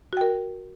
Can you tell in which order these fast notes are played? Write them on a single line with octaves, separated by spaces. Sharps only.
F#4 G5 A#4